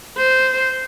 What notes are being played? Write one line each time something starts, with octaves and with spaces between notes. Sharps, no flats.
C5